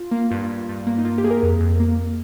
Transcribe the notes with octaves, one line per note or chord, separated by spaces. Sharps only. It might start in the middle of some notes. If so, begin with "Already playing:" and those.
Already playing: F4
A#3
G2 F4
G2
G2
A#3
D#4
A#3 F4
G4
A#3 G#4
A#4
F2
F2
A#3